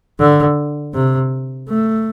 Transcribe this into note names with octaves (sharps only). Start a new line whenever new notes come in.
D3
C3
A3